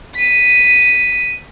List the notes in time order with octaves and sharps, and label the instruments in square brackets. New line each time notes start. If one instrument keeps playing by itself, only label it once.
[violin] B6 D#7